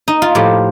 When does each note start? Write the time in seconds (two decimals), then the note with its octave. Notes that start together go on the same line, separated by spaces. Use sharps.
0.08 D#4
0.22 F4
0.35 A2 F3 G4